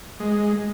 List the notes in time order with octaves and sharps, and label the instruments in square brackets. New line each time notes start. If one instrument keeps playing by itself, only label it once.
[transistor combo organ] G#3